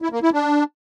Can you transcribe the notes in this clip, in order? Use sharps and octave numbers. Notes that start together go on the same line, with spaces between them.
E4
A#3
E4
D4